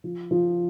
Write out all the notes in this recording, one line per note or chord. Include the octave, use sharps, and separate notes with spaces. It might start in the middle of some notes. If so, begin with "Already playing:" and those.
F3
F3